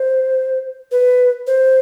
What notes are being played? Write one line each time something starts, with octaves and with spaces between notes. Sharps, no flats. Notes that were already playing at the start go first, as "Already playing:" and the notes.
Already playing: C5
B4
C5